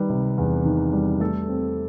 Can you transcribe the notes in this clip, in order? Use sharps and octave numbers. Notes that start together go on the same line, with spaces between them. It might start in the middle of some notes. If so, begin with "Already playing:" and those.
Already playing: D#3 G3 B4
C3
E2
D#3
G3
A3 A4
C4